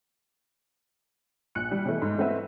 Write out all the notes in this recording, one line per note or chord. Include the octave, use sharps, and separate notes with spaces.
A#1 F#6 C#7
G3
B2 E3 A3
G#2
A3 C4 E4 F#4 B4 E5